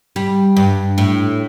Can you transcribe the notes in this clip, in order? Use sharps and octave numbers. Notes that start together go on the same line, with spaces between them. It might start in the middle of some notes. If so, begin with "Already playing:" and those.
G3
G2
A2